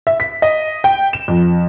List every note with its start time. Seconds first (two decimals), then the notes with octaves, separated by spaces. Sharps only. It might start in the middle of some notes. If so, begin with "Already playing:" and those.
0.07 E5
0.20 B6
0.42 D#5
0.84 G5
1.13 E7
1.28 F2